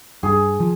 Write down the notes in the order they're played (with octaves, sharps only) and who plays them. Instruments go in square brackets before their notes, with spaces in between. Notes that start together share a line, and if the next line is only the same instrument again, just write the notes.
[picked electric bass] G2 [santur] G#4
[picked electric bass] F3